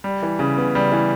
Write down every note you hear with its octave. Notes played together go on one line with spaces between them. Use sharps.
G3
E3
C#3
B3
G3
E3